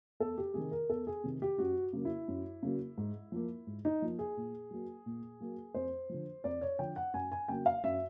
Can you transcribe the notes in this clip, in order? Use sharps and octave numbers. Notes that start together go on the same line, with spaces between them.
E2 A4
G4
C3 D#3 G#4
A#4
E2 A4
G#4
C3 D#3
G4
F#2 F#4
C#3 F#3 A#3
E4
F#2
C#3 F#3 A#3
G#2
F3 A#3
G#2
D#4
F3 A#3
G#4
A#2
F#3 A#3
A#2
F#3 A#3
F2 C5
D3 F3
F2 D5
C#5
D3 F3 G5
F#5
F#2 G#5
G#5
C#3 F#3 A#3 G5
F5
F#2 E5